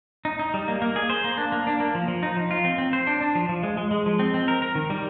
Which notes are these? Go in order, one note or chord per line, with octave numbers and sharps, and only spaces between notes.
D#4
D#4
G3
A#3
A#3
G#4
C5
A#3
D4
A#3
D4
A#3
F3
F3
D#4
F3
F4
C4
C4
C5
D4
D4
F3
F3
G#3
G#3
G#3
F3
C4
C4
A#4
A#4
D#3
G3